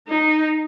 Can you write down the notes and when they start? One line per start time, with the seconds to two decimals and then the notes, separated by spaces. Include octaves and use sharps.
0.08 D#4